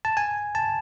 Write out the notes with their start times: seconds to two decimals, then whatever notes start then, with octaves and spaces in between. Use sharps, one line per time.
0.05 A5
0.17 G#5
0.55 A5